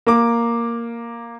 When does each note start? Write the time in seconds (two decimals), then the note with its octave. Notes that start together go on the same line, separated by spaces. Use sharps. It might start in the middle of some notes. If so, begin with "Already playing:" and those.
0.07 A#3 D6